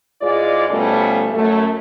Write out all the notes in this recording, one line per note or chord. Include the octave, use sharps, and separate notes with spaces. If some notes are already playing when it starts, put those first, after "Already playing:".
G#2 G#3 E4 F4 D5
B2 F3 G3 A3 C#4 A4
F#2 A3